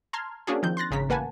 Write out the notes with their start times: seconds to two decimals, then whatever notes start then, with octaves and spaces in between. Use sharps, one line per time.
0.13 A5 A#5 C6 F6 G#6
0.47 A#3 C#4 D4 F#4 G#4
0.63 D#3 F3 C4 G6
0.77 C6 F#6 A6 A#6
0.91 G#1 C#3 A#5 B6
1.09 A1 A#3 B4 F#5 G#5 A5